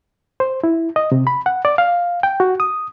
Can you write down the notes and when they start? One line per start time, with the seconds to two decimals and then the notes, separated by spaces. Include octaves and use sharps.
0.40 C5
0.64 E4
0.96 D#5
1.12 C3
1.27 B5
1.46 F#5
1.65 D5
1.78 F5
2.23 G5
2.40 F#4
2.60 D#6